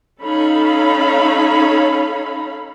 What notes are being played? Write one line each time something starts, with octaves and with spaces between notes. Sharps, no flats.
C#4 D#4 A4 C#5 F5 B5